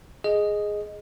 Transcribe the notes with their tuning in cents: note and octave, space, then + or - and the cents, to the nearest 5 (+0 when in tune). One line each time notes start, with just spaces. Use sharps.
G#4 +0 D#5 +0